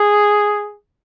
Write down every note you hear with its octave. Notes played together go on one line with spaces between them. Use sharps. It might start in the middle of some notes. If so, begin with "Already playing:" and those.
Already playing: G#4